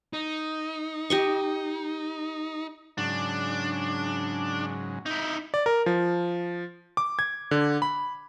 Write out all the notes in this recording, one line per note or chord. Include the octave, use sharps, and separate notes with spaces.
D#4
G4 D#5 C#6
G#2 C#3 F#3 D4
D#4 E4
D5
A#4
F3
D6
G#6
D3
B5